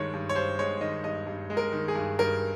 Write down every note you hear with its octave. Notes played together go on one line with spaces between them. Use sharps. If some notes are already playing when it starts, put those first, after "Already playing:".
Already playing: G2 D#3 G#3 C#5
G2
C#5
G2 C5
G#3 C#5
D#3 D#5
G2 D#5
G2
G#3
A#4
D#3
G#4
G2
G2 A#4